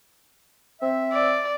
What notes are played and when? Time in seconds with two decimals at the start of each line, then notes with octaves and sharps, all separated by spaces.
0.82 C4 E5
1.12 D5